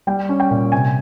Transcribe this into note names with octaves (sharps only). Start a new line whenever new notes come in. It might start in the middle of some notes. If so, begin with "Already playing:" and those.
G3 G5
C#4
G5
A#2
C3 G#5